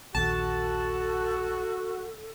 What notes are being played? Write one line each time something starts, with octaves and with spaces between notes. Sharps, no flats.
A#1 D#2 F#4 A4 A5